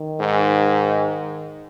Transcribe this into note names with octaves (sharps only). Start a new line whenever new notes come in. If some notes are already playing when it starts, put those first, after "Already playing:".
Already playing: D#3
G#2